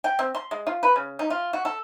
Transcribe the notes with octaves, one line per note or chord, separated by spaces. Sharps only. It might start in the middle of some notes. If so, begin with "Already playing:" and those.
G5
C4
C6
G#3
F4
B4
C#3
D#4
F4
F#4
A4